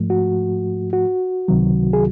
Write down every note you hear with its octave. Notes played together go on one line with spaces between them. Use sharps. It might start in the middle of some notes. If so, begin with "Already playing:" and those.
Already playing: G#2 F3 A3
F#4
F#4
C#2 C3 D#3 F#3
G#4